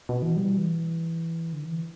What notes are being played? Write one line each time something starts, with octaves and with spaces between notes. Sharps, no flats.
B2
E3
G3
E3
D3
E3